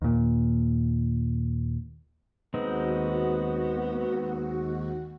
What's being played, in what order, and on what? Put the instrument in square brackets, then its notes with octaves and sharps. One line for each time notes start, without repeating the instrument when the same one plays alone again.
[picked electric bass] D#2 A#2
[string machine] D#2 F#4 [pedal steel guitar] G#3 C4 D#4 [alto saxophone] B3